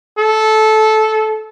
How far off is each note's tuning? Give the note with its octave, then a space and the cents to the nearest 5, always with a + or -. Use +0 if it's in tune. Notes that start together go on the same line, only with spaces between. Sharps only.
A4 -15